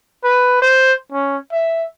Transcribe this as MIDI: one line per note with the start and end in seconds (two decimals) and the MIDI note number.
0.24 0.58 71
0.62 0.93 72
1.12 1.37 61
1.53 1.86 76